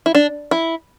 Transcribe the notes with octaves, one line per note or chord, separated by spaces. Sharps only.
E4
D4
E4